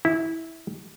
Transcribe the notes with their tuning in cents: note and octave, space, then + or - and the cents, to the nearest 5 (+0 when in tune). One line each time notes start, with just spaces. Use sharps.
E4 -15